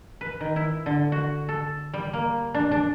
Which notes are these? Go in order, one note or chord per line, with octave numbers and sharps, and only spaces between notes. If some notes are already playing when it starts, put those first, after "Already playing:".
B4
D#3
E4
D3
F#4
A4
G3
A#3
D4
D4